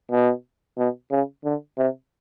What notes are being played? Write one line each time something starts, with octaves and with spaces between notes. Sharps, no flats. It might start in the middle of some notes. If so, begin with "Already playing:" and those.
B2
B2
C#3
D3
C3